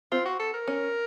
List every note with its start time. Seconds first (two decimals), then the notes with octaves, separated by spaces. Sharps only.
0.11 C4 F4
0.25 F#4
0.39 A4
0.53 A#4
0.68 C#4